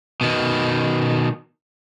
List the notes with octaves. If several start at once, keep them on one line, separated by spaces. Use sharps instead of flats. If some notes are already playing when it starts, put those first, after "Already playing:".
B2 D#3